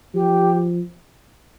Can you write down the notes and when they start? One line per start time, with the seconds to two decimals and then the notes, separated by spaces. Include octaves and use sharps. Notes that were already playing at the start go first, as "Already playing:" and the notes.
0.14 F3 G4